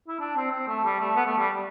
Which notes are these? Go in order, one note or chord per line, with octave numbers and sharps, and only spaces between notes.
E4
D4
C4
C4
A3
G3
A3
B3
A3
G3